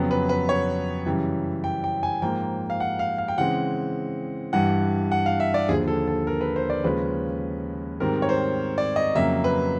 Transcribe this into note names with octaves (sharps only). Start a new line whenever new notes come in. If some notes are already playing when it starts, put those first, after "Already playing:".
Already playing: F2 C#3 F#3 B3
B4
B4
C#5
F#2 C#3 E3 G3
G5
G5
G#5
G#2 F3 A#3 G5
F5
F#5
F5
F5
G5
C#3 E3 G#3 C4 F#5
G2 E3 G3 F#5
F#5
F5
E5
D5
D#2 D3 F3 G#4
A4
A4
A#4
B4
C5
D5
D#2 C#3 F3 G#3 C#4 B4
G#2 D#3 G3 C4 A#4
C#5
C5
D5
D#5
F2 C#3 F#3 A#3 E5
B4